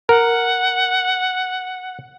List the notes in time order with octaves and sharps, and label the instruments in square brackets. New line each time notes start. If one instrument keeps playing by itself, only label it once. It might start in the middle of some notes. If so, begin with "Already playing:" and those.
[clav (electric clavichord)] A#4 [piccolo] F#5